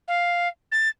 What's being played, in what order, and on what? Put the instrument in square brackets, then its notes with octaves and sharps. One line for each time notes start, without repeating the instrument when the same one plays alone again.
[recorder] F5
A6